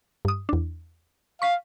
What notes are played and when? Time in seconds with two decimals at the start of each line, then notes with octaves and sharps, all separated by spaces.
0.25 G2 D#6
0.49 E2 D4
1.42 F5 C#6 B6